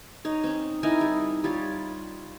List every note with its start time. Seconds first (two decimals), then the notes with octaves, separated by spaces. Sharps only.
0.25 D#4 C#5
0.44 C4 C#4
0.83 D#4 E4 A#4 G#5
1.01 G3
1.44 G3 F4 C#5